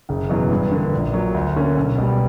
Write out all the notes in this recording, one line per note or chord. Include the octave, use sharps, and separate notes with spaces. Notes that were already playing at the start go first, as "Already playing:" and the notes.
F#1
E2 B2 F#3
G2
D3 A#3
A#1
A#2 F#3
D2
D3 A#3 C#4
B1
B2 G3